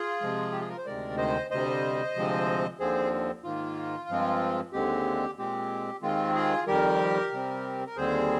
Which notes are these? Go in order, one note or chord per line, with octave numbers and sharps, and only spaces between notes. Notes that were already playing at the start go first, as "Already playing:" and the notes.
Already playing: F4 G#4
C3 F3 G#3
G4
G#4
A#4
C5
D2 C3 D#3 G#3 A#4 D5
C5 D#5
D2 C3 G3 C5 D#5
D2 C3 F3 G#3 C4
D#2 D3 F3 C4 G#4 C5
G#2 D#3 A#3 F4
G2 F3 G#3 C4
D#2 D3 G#3 C4 G4
A#2 G#3 C4 G4
D#2 D#3 G#3 C4 F4
F4 G#4
F2 D#3 G3 G4 A#4
C3 G3 C4
A#4
D#2 D3 G3 C4 G#4 C5